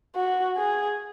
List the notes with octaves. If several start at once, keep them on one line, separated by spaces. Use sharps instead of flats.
F#4
G#4